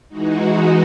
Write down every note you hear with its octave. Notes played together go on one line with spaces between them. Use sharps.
E3 G#3 D#4 F#4